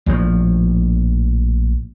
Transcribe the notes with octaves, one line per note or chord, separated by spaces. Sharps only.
A#1 A2 F3